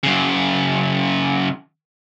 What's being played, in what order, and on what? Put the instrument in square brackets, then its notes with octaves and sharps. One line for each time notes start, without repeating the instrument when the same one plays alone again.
[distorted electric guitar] F#2 C#3